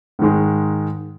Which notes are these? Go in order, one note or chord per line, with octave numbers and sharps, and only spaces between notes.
G#2 D#3 G#3